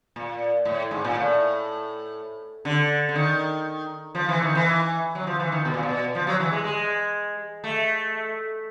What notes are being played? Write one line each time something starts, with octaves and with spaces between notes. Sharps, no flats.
A#2
A2
G#2
A#2
A2
D3
D3
D#3
F3
E3
D#3
E3
F#3
F3
E3
D#3
B2
A#2
B2
F3
F#3
E3
G#3
G#3
A3